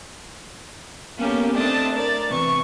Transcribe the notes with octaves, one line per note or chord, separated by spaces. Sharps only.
A#3 B3 C#4 G4 A4 A#4
A3 C4 D4 D5 D#5 A5
A#4 D5 A6
C3 E3 C#6